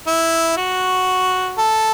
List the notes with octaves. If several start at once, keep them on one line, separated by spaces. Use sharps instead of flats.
E4
F#4
A4